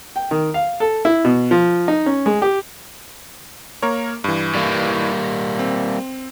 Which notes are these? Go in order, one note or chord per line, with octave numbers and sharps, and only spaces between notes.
G5
D#3
F5
A4
E4
B2
F3
D#4
C#4
G#3
G4
A#3 A#4 C#5
G2 E3
G3 A#3
C4